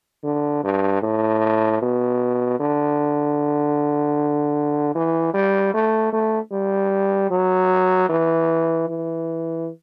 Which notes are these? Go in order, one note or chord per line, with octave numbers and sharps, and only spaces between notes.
D3
G2
A2
B2
D3
E3
G3
A3
A3
G3
F#3
E3
E3